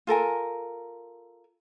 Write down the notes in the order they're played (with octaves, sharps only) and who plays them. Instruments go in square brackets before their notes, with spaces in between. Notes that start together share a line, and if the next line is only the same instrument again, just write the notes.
[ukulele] F4 A4 A#4 G#5